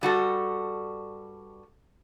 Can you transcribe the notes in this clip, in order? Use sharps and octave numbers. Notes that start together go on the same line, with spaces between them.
G2 G3 F#4 A4